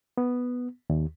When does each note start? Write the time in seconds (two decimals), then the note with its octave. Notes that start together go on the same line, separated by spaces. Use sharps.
0.18 B3
0.90 D#2